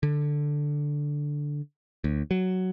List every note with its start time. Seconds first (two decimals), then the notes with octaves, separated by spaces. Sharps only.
0.03 D3
2.04 D2
2.31 F#3